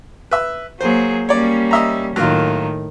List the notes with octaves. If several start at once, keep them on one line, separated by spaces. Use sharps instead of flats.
B4 E5
F#3 A#3 G#4 C5
G3 A#3 C#4 C#5 D5
D#5 E5 A#5
A2 D#3 F#3 A#3 F4